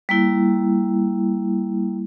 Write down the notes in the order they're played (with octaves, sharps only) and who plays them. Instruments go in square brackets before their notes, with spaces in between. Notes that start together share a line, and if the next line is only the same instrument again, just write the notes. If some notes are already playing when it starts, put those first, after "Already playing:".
[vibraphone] G3 A#3 E4